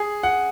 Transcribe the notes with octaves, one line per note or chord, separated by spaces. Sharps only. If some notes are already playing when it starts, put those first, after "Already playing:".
Already playing: G#4
F#5